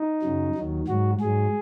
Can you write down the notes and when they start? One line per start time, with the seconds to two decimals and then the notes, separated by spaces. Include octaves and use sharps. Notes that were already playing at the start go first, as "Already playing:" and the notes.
Already playing: D#4
0.22 F#2 C#3 F#3
0.55 D#2 D#3 F#3
0.88 G#2 F#3 F#4
1.20 G#2 F#3 G#4